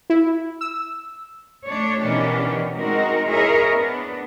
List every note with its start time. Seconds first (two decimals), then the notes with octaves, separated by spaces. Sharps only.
0.10 E4
0.61 E6
1.67 A3 D4 C#5
2.03 B2 D#3 E3 C#4 D4 G4
2.77 G#3 C4 D#4 F#4 A#4
3.28 E4 G#4 A#4 C#5 D#5 E5
3.73 B3 D4